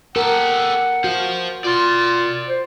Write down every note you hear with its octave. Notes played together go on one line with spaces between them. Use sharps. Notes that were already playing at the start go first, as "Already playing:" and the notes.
G4 A4 A#4 F#5
F#4 C5 F5
F4 D5 C6
C5